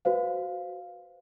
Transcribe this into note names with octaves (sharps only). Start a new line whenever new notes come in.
F#4 B4 C5 F5